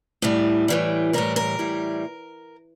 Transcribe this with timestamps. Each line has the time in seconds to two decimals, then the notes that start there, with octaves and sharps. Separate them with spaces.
0.22 A2 E3 G3
0.68 A2 E3 G3
1.13 A2 E3 G3 A#4
1.36 A#4
1.59 A2 E3 G3